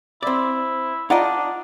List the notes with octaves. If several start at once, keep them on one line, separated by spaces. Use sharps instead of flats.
C4 E4 D5
D4 D#4 F4 D5 D#5 F#5 A#5